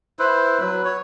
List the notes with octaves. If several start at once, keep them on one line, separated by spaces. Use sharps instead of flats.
E4 B4 C5
F#3 B4
C#5